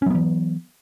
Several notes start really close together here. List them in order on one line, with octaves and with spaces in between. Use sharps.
C#4 F#3 B3 E3